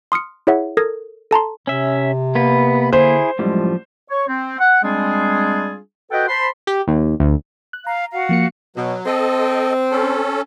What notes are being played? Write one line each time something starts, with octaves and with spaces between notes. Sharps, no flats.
C6 D#6 F6 C#7
E4 G#4 C#5 E5 F#5
A4 A#4 D#6 G#6 A#6
A4 A5 A#5 C6
C3 C#4 E5
A#3 B3 B4
D3 E4 G#4 C5
F#2 A2 F3 G3 G#3
C#5 C#6
C4
F#5
G3 G#3 C4 D4 F4 G#4
F#4 A4 B4 D#5 F#5 G5
C5 A5 B5 C6
G4
D#2
D2
F#6
F5 A#5
F#4 F5 F#5
F3 A#3 C#7
B2 F#3
C4 A4 D#5
C#4 A4